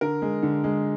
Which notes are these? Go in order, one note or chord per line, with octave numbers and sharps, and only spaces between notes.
D3 A#4
G#3
D3
G#3